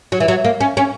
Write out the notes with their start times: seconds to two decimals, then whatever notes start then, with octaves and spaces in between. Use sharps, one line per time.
0.12 F#3
0.20 E3
0.28 F#3
0.44 A#3
0.60 C#4
0.77 C#4